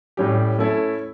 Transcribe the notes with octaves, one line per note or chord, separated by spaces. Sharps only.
A2 G3 C#4 G4
A3 C#4 E4 A4